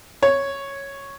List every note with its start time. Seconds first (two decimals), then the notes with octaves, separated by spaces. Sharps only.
0.23 C#5